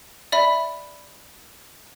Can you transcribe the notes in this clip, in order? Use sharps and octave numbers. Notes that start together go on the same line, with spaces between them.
D5 E5 B5